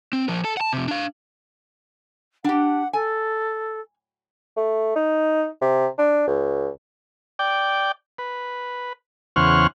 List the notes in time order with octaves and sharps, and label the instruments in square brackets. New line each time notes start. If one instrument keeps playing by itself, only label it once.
[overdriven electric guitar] C4
F3 A#4
A4 A5
F#5 A5
F2 C3
D4 F5
[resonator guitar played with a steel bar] D4 G4 [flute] F#5
[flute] A4 [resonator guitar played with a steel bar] G#5
[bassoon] A3
D#4
C3
D4
C#2
[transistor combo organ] D5 G5
B4
E2 C#3 C5 F#5 C#6 F6